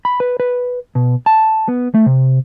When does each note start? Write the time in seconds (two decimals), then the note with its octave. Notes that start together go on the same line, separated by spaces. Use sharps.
0.05 B5
0.20 B4
0.40 B4
0.95 B2
1.26 A5
1.68 B3
1.94 A3
2.06 C3